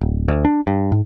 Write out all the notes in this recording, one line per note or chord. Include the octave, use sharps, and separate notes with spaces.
D1
D2
D4
G2
G#2